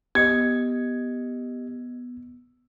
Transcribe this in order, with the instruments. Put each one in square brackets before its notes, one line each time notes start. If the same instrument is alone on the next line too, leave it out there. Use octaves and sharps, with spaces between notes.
[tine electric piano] B3 C#7 [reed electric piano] G4 D#5 [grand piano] G#6